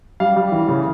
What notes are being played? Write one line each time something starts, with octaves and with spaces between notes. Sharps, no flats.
G3 F5
G3
E3
C#3